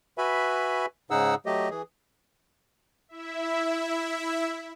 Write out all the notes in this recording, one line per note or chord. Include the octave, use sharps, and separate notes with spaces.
F#4 B4 E5 G#5 B5
G#2 C#3 D#4 G#4 F#5 E6
F#3 A3 G4 D#5
E3 G#4
E4 E5